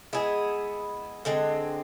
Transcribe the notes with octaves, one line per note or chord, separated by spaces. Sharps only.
G#3 B3 E4 G#4
D3 G#3 C4